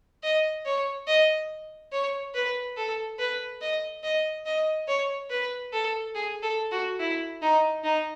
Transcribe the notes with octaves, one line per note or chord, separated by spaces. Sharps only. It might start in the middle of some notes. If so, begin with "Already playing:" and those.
D#5
C#5
D#5
C#5
B4
A4
B4
D#5
D#5
D#5
C#5
B4
A4
G#4
A4
F#4
E4
D#4
D#4